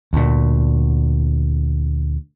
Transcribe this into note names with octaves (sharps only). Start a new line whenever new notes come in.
D2 A#2